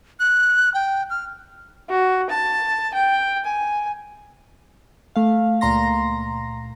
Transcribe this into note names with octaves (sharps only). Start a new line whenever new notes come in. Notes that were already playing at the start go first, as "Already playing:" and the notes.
F#6
G5
F6
F#4
A5
G5
G#5
A3 F5
C#2 A#2 A#5 C6 A#6